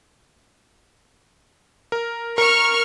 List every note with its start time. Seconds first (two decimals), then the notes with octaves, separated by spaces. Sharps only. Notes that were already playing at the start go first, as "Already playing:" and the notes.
1.92 A#4
2.38 A#4 C#6 F6